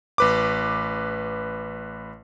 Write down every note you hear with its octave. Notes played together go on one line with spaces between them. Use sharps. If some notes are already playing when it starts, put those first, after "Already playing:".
A1 B4 D6